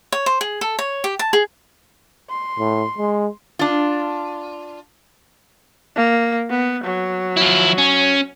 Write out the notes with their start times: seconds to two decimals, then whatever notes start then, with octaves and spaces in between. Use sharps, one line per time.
0.12 C#5
0.26 C5
0.41 G#4
0.61 A4
0.79 C#5
1.04 G4
1.19 A5
1.33 G#4
2.29 C6
2.59 A2
2.98 G#3
3.59 D4 F4
5.96 A#3
6.50 B3
6.84 F#3
7.37 F3 E4
7.78 C#4